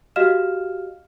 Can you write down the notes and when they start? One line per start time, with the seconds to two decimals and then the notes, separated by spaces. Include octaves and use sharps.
0.16 F#4 G4 D#5 F5 F6 E7